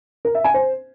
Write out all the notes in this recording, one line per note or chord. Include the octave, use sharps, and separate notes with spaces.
A#4
E5
G#5
C5